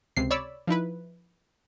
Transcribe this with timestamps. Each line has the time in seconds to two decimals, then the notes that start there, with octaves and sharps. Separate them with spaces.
0.17 C#2 C3 C7
0.31 C#5 D5 B5 E6
0.67 F3 D#4 E4 B4